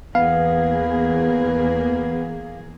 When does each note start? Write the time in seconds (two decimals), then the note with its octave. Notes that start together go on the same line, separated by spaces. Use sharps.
0.15 E2 A#3 B3 G#4 F5